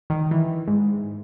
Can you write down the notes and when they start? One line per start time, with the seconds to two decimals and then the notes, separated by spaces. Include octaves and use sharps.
0.10 D#3
0.31 E3
0.68 G#2